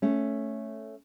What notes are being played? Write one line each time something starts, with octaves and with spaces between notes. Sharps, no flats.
A3 C#4